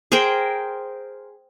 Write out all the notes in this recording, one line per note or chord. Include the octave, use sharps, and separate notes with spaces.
G#4 A#4 C5 G5